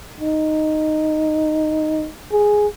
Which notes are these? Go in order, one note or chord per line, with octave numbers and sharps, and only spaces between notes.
D#4
G#4